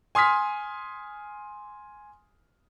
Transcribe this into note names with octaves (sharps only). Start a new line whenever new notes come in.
G#5 C6 D#6 F6 B6